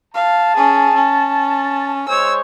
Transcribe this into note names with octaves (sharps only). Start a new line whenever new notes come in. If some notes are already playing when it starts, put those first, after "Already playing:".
F5 A5
C#4 G#4
C#4
G#3 C5 C#5 E6